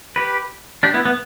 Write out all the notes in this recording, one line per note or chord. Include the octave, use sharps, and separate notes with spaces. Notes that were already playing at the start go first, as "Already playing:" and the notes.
G4 B4
D4 G4
B3 E4
B3